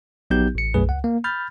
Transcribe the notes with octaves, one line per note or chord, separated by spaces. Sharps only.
A#1 F#3 B3 D#4 G4 G6
A1 C#7
B1 F#2 A3 G#4 B4
C#2 F#5
A#3
B5 F6 G6 A6